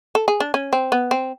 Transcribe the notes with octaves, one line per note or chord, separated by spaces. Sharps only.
A4
G#4
D4
C#4
C4
B3
C4